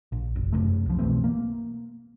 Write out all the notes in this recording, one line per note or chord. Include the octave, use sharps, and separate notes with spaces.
A#1
F#1
F#2 C3 A3
C2 F3
B2 E3 A3 C4
A#3